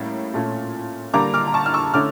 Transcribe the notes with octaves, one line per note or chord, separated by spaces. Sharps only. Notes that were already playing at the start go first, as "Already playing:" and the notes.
Already playing: A2 G3 A#3 C#4
A#2 A3 C#4
D3 G3 A#3 A#5 D6
D6 F6
A#5
A5 C#6
F6
C#6 E6
D3 A3 C#4 D6 F6